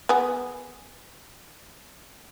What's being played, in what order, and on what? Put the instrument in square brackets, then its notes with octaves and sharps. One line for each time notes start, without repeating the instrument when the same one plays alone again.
[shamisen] B3 G#4